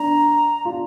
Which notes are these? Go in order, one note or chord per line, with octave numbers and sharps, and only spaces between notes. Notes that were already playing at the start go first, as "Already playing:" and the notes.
Already playing: D4 A#5
F4